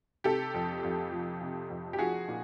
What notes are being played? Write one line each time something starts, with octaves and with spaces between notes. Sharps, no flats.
C3 G4 A4
F2
F2
F3
C3
F2
G4
F3 F#4 G#4
A#2